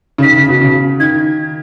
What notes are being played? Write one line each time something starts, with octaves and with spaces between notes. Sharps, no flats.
C#3
D#3 B6
C#3
B2
C#3
D#3 G#6